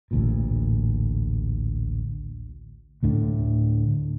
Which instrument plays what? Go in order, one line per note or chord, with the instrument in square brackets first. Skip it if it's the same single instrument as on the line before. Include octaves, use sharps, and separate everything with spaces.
[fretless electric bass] A1 D2 A#2
[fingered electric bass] D2 A2 D3